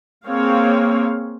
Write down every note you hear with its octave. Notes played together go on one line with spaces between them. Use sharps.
A#3 C4 G#4 C#5 F5